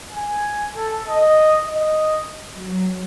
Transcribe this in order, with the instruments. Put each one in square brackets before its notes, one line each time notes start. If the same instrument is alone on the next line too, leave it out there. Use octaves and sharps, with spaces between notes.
[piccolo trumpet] G#5
A4
D#5
D#5
[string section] F#3